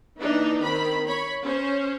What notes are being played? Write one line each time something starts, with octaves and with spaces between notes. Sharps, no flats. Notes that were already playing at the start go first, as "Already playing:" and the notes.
E3 A#3 D4 D#4
D#3 C4 B5
C#5 B5
C#4 C5